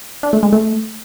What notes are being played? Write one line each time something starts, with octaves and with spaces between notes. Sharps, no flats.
D4
A3
G#3
A3